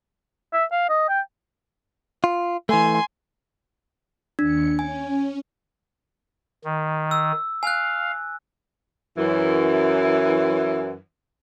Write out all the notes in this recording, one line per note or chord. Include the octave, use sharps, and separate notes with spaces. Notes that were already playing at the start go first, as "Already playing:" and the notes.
E5
F5
D#5
G5
F4
E3 A3 G#5 C6
D#2 D4 C#7
C#4 G#5
D#3
E6
F5 G#5 F#6
F#2 E3